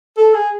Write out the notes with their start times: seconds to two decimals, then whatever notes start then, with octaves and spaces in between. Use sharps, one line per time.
0.17 A4
0.34 G#4